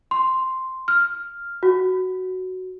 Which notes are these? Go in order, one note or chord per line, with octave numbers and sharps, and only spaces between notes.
C6
F6
F#4